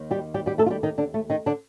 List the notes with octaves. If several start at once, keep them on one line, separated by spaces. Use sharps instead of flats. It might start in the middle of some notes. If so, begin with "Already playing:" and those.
Already playing: D#2 D#3
G3 G4
G3 G4
G3 G4
A3 A4
F4
G3 G4
D#3 D#4
D3 D4
A3
D#3 D#4
D3 D4